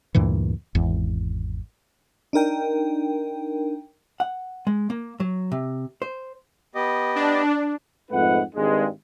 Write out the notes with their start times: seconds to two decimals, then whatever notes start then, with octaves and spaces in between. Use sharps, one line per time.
0.15 D2 G2 A#2 E3
0.75 G#1 E2
2.33 D4 D#4 A#4 G5
4.20 F#5
4.67 G#3
4.90 A#3
5.20 F#3
5.52 C3
6.02 C5
6.75 B3 G4 D#5
7.16 D4
8.11 F2 G#2 A3 D#4 B4 F#5
8.55 G#1 G2 G#3